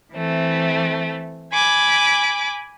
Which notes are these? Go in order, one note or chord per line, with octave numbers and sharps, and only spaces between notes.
E3 A3 C4
G#5 B5 D6